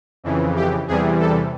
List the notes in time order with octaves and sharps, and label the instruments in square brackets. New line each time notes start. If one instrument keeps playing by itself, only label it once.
[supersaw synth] F2 C#3 E3
G4
E2 C3 E3 G3 G#4
A4